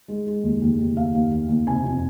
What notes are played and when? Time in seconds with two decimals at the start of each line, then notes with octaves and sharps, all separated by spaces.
0.08 G#3
0.27 G#3
0.43 D#2
0.62 D#2
0.79 D#2
0.96 D#2 F5
1.14 D#2
1.31 D#2
1.49 D#2
1.67 C3 G#5
1.84 F2